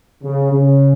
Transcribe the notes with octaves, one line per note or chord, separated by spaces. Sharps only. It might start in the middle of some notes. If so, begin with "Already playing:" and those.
C#3
C#3